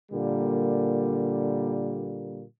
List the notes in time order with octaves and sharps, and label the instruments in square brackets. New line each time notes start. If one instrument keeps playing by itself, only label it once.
[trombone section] A#2 D3 G3 A#3